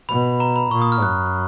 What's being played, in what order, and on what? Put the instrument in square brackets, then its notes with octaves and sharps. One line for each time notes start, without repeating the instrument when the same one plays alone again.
[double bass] B2 [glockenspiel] B5
[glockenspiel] A#5
B5
[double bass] A#2 [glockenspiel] C#6
[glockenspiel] D#6
F6
[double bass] F#2 [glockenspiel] F#6